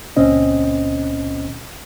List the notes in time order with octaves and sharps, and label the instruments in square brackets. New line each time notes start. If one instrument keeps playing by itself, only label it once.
[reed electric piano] C#2 A#2 C4 C#4 D#5